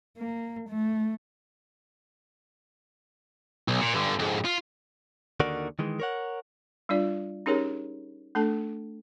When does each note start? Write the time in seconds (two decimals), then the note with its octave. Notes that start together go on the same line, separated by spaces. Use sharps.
0.18 A#3
0.69 A3
3.68 B1
3.81 A#2
3.93 G2 D3
4.19 F2 G#2
4.45 F4
5.40 D#2 D3 D#3 F#4 A#4 D5
5.79 D#3 E3 G#3
6.00 A#4 C#5 F#5
6.89 G3 D4 F4 D5
7.46 C#4 D#4 G4 G#4 A#4 C#5
8.35 A3 D4 A4 A5